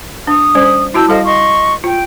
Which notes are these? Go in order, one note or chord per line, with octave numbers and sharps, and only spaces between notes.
D4 D#6
G3 C#4 C5
E4 F#4 A5 E6 G6
G3 A4 C5 D#5 F5
D#5 C6 C#6
F4 G5